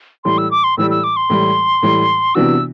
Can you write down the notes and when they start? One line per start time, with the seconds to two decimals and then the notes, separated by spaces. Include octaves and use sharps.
0.24 A2 E3 G3 C6
0.38 E6
0.51 D6
0.64 C6
0.77 A2 E3 G3 E6
0.91 E6
1.04 D6
1.16 C6
1.30 A2 E3 G3
1.82 A2 E3 G3
2.35 C3 E3 B3 D4 F#4 E6